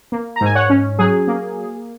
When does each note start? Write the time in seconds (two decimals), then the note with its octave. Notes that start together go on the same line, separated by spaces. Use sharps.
0.12 A#3
0.36 A#5
0.41 G#2 G#5
0.55 C#5 F#5
0.70 C#4
0.99 F#3 G#4
1.28 A#3